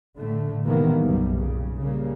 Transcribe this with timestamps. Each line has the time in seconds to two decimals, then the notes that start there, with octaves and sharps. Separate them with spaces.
0.18 A2 D3 A3
0.65 C3 D#3 E3 G#3 A#3 B3
1.01 B1 F#2 G3
1.37 A#2 C#3
1.80 C#3 G3 A#3